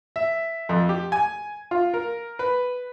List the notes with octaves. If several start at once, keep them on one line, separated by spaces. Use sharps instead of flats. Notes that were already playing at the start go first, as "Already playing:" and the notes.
E5
F2
G4
G#5
F4
A#4
B4